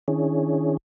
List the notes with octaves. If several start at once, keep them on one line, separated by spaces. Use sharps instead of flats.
D#3 C#4 D4 E4 G#4 C#5